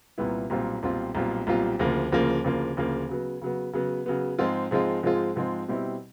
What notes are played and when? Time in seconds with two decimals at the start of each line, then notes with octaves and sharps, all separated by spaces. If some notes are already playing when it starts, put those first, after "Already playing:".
0.18 C2 A#2 G3 B3 E4
0.50 B1 A#2 G3 C4 F4
0.83 B1 A#2 G3 C4 F4
1.15 B1 A#2 G3 C4 F4
1.47 B1 A#2 G3 C4 F4
1.79 D2 C#3 F3 A#3
2.12 D2 C#3 F3 A#3
2.44 D2 C#3 F3 A#3
2.77 D2 C#3 F3 A#3
3.09 C#3 F#3 B3
3.41 C#3 F#3 B3
3.73 C#3 F#3 B3
4.06 C#3 F#3 B3
4.38 G#2 F3 G#3 C4 F4
4.71 G#2 F3 G#3 C4 F4
5.03 G#2 F3 G#3 C4 F4
5.36 G#2 F3 G#3 C4 F4
5.68 B2 G3 C4 E4